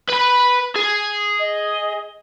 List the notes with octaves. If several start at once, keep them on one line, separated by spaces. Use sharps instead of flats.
B4 B5
G#4
D#5